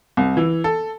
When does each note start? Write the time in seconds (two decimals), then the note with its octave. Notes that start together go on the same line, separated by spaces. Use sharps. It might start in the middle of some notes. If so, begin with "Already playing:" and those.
0.17 C2
0.37 E3
0.64 A4